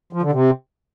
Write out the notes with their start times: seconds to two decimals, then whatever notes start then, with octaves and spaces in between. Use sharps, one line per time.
0.13 F3
0.22 D3
0.32 C3